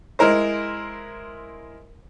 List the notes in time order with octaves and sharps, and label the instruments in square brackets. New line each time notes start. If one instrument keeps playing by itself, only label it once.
[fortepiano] G#3 E4 A#4 C5